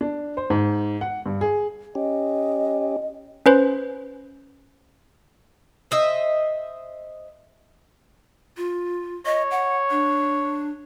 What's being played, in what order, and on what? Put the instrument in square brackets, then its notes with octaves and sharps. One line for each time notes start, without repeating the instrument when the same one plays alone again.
[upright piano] D4
C5
G#2
F#5
G2
G#4
[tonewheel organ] C#4 G4 [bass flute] D#5
[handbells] C#4 B4 C5
[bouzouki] C5 D#5 E5
[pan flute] F4
[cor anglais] C#5 [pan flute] D#5
[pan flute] F#5
D4